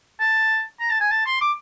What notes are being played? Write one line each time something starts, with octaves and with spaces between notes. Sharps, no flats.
A5
A#5
A5
G#5
A5
C6
D6